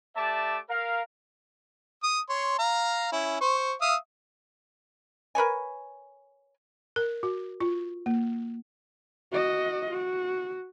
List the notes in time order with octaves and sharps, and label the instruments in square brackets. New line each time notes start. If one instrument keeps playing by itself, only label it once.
[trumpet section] A3 G4 D5 E5 A5 D6
A#4 F5
[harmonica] D#6
C#5 C6
F5 A#5
C#4 E4
C5 C#6
E5 F5 D#6
[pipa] A#4 B4 C#5 G#5
[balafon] A#4
F#4
F4
A#3
[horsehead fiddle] F#4 D#5
F#4